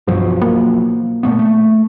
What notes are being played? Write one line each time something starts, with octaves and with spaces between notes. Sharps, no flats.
B1 G2 F3 F#3
A#3
A#2 A3 B3
A3